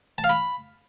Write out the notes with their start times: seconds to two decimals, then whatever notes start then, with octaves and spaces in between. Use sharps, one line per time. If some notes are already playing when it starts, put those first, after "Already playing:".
0.18 A5
0.24 F5
0.29 B5